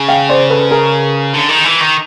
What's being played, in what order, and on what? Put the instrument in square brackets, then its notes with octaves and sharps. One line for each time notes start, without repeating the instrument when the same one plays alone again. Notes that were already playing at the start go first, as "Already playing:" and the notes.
Already playing: [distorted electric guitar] C#3
[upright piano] F5 G5
C5 D5
A4 B4
G#4 A#4
[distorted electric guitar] D3
D#3
E3
D#3